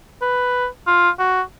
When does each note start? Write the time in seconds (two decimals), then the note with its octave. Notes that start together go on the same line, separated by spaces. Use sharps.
0.22 B4
0.87 F4
1.19 F#4